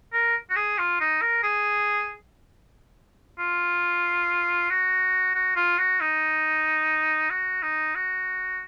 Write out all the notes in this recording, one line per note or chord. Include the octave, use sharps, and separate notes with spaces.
A#4
F#4
G#4
F4
D#4
A#4
G#4
F4
F#4
F#4
F4
F#4
D#4
F#4
D#4
F#4